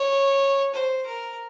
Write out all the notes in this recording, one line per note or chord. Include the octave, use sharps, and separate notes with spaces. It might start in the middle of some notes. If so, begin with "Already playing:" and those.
Already playing: C#5
C5
A#4